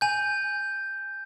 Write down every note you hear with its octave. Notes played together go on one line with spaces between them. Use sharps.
G#5 G6